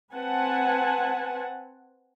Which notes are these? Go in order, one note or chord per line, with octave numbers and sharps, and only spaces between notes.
C4 B4 F#5 G#5 A5